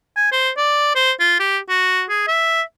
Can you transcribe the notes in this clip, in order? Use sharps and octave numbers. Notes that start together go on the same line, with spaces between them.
G#5
C5
D5
C5
F4
G4
F#4
G#4
E5